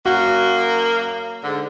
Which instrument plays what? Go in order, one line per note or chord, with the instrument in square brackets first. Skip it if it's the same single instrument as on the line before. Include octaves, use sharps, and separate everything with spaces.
[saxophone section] F#2 A#3 [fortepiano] F#4
[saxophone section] G#2 D3